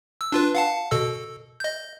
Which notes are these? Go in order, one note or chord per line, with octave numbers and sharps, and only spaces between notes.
E6
D4 F4 B4
F5 F#5 A5
B2 A4 E6
D#5 G6